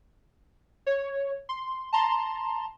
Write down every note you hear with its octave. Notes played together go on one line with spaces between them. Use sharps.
C#5
C6
A5 A#5 C6